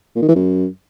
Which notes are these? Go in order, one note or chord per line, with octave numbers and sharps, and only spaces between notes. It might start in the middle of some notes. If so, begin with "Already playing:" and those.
A#2
D#3
E3
F#2